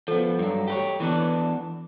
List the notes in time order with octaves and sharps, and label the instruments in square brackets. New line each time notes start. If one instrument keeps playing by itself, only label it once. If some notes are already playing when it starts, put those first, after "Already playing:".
[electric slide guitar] F3 B3 [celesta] A4
[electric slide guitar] G2 F#3
G4 B4 C#5
E3 B3 D4